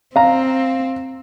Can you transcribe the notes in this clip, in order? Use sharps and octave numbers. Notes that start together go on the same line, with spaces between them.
C4 F5 A#5